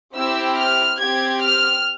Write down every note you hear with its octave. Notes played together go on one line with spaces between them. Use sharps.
C4 E4 G4 E6
F6
C4 G4 G#6
F6